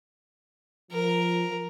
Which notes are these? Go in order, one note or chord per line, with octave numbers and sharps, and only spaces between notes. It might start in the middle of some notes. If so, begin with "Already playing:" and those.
F3 A#4